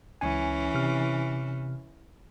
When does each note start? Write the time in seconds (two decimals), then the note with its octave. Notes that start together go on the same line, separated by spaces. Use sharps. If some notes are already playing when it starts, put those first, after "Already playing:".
0.21 C#2 E3 C#4 G#5
0.75 C3 F6